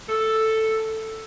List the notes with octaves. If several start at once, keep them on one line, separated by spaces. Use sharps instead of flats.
A4